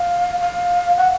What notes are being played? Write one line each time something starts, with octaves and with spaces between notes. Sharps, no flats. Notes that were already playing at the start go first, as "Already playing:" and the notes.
Already playing: F5
F5
F#5